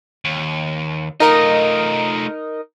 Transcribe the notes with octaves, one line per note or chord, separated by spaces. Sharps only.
D#2
A3 D#4 F4 A#4 D#5